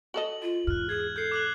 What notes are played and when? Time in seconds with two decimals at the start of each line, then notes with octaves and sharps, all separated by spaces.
0.14 F#4 A4 D#5 F#7
0.42 F4
0.67 E2 G#2 F6 F#6
0.89 G#4 G#6
1.16 A4 G6 C7
1.32 D6 F#6 F#7